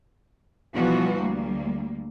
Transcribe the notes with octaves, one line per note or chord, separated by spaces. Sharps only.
B2 E3 F3 G3 B3 F#4
D2 G3 A#3